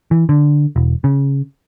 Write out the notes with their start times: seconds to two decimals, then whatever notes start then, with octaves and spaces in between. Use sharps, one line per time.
0.11 E3
0.29 D3
0.76 E1
1.04 C#3